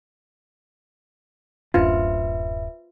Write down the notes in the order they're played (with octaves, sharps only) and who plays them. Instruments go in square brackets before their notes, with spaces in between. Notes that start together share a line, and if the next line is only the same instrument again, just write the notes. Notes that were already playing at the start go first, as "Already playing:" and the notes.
[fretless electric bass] D1 F#2 D4 [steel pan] F4 [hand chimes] B4 E5